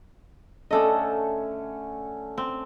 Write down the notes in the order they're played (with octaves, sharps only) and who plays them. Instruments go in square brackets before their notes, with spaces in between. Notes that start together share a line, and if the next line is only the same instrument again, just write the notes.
[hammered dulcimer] D3 A3 C#4 [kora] D4 A4 D#5
[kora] C4